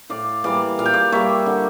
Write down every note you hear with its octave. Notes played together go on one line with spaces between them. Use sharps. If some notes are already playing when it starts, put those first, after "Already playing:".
A2 D5 F5
E3 G3 A#3 D5 F5
A#2 F5
G5
D5 F5
G3 A#3 C#5 E5
D3